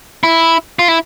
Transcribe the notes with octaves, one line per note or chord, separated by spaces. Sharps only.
E4
F4
E4